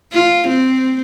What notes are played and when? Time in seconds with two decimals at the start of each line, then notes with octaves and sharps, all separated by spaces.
0.12 F4
0.48 C4